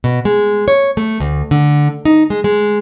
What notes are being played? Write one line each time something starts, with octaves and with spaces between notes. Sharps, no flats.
B2
G#3
C#5
A3
D2
D3
D#4
G#3
G#3